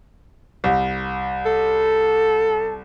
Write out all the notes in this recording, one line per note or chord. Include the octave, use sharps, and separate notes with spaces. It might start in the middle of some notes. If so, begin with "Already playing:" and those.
C2
A4